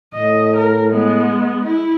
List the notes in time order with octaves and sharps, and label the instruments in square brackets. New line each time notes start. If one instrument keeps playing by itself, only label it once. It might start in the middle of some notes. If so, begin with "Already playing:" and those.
[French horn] A2 [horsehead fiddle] D#5
[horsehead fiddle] A#4
G#3 B3
E4